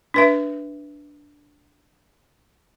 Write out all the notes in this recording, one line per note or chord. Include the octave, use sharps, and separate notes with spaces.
D4 B4 E5